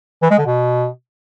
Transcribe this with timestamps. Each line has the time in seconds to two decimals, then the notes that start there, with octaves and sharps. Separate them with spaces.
0.22 E3
0.30 G#3
0.38 D3
0.46 B2